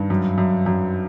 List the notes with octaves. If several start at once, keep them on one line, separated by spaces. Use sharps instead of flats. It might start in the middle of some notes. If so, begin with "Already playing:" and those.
Already playing: G2 D#3
F#2
F#2
F#2